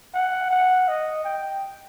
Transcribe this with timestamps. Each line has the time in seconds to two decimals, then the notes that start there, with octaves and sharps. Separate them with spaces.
0.14 F#5
0.51 F#5
0.88 D#5
1.25 G5